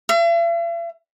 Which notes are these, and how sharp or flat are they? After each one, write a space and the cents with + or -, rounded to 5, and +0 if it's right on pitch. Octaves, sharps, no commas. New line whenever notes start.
E5 +45